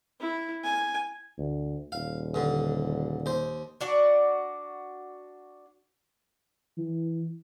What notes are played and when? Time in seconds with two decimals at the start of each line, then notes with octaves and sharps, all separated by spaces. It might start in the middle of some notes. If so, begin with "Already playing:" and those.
0.21 E4
0.64 G#5
1.38 D2
1.92 D#1 F5
2.34 G2 D3
3.26 D#2 C5
3.81 D4 F#4 D5
6.77 E3